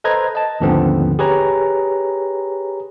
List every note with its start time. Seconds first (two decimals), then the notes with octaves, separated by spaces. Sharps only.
0.04 A4 B4 C5 D#5 A#5 G#6
0.35 D#5 A5
0.60 D#2 G#2 D3 F3 B3 C4
1.19 G4 G#4 B4 C#5 A#5